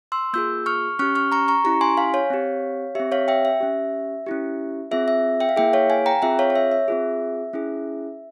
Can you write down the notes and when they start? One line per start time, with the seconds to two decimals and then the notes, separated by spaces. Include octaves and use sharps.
0.12 C6 E6
0.33 A#3 F4 G#4 E6 G6
0.66 C#6 F6
0.99 C#4 G4 C#6 F6
1.15 C#6 F6
1.32 A#5 C#6
1.48 A#5 C#6
1.64 C#4 E4 G4 A#5 C#6
1.81 G#5 C6
1.97 F5 G#5
2.14 C#5 F5
2.30 C4 G4
2.95 C4 G4 E5
3.12 C#5 F5
3.28 E5 G5
3.45 E5
3.60 C#4 G4
4.26 C#4 E4 G4
4.91 C4 F4 G#4 E5
5.08 E5
5.40 E5 G5
5.49 F5
5.56 A#3 E4 G#4 E5 G5
5.73 C#5 F5
5.90 F5 G#5
6.06 G5 A#5
6.22 C4 F4 G#4 E5 G5
6.39 C#5 F5
6.50 C#5
6.56 E5
6.72 E5
6.88 C4 F4 G#4
7.53 C#4 E4 G#4